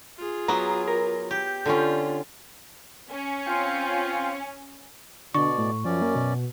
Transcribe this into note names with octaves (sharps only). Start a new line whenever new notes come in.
F4 G#4
F#3 B3 A#5
A#4
G4 G6
D3 C#4 F4
C#4
C4 F4
B2 D3 D5 C#6
A2
F#2 F3 C#4 D5
A#3
B2